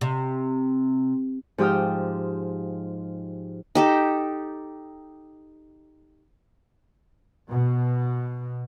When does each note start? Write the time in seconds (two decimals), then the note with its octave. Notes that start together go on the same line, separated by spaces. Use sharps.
0.01 C3
1.58 G#2 F3 G4 G5 D#6 F6
3.75 D#4 G4 A4
7.49 B2